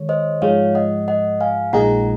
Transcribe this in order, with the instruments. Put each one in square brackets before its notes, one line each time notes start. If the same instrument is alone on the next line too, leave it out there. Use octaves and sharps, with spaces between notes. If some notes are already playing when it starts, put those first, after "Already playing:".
Already playing: [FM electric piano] D#3 G#3 C#5
[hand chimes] C5 D#5
[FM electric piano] G#2 F3 G#3 [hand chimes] C#5 F5
[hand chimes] D#5 F#5
D#5 F#5
F5 G#5
[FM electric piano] A#1 A#2 G#3 D#4 G#4 [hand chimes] F#5 A#5